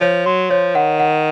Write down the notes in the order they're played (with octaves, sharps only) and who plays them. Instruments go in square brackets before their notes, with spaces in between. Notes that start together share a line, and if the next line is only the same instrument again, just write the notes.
[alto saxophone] F3 [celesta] C#5
[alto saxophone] F#3 [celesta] C6
[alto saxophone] F3 [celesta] C#5
[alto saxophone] D#3 [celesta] F#5
[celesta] F#5